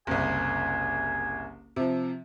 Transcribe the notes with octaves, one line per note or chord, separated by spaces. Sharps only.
F#1 C2 G#5
C3 F3